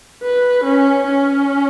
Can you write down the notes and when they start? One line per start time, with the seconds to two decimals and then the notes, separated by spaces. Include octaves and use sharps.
0.23 B4
0.64 C#4
1.07 C#4